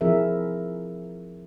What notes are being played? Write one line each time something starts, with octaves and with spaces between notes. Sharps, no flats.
F3 C4 E4 G#4 A#4 E5